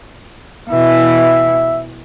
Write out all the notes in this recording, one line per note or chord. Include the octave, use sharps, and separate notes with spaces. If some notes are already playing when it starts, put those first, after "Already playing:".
B2 E3 E5